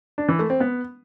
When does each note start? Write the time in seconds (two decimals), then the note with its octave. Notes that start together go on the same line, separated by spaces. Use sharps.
0.18 D4
0.29 E3
0.39 A3
0.50 C4
0.60 B3